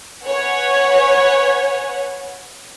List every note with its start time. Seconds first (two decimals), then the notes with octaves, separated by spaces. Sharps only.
0.24 B4 C#5 F#5 G#5